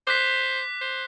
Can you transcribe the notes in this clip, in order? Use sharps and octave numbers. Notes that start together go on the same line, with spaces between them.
C5 D6 F#6 B6
C5